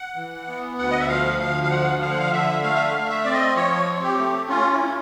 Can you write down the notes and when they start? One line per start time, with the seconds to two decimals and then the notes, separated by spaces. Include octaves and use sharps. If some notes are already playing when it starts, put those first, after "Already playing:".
Already playing: F#5
0.16 E3
0.47 B3
0.78 D2 F#5
0.91 D#5
0.99 E5
1.08 F3 F5
1.40 D2 F5
1.64 F5
1.70 F3 F#5
2.02 D3 F5
2.10 F#5
2.19 F5
2.33 D3 E5
2.63 A3 F5
2.75 E5
2.87 F5
2.95 A3
3.10 E5
3.24 C4 D5
3.33 D#5
3.56 F3 C#5
3.87 C4
4.02 G4
4.18 A3
4.49 C#4 F4
4.72 E4
4.80 C#4